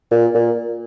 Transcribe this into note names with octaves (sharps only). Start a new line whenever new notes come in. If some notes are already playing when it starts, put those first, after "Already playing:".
A#2
A#2